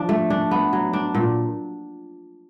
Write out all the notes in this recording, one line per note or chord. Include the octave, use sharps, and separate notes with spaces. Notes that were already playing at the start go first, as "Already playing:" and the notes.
Already playing: F3 D4
A3
D4
B3
F#3
D4
A#2